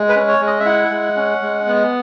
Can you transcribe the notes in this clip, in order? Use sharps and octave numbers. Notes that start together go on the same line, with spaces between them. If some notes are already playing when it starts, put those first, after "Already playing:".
Already playing: G#3
B4
C#4
C#5
G#3
D#5
E5
E4 F#5
G#3
C#4
G#3
B3